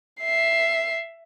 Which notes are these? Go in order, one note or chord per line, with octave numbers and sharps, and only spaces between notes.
E5 C7